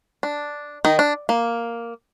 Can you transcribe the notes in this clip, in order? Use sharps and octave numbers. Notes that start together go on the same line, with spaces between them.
D4
D#3 D#4
D4
A#3